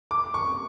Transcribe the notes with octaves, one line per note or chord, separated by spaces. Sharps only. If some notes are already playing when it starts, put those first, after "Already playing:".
D6
C#6